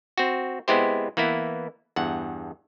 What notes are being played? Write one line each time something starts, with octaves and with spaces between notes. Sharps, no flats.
C4 F#4
G#3 B3 C4 E4 G4 C5
E3 A#3 B3 E4
E2 G2 F#5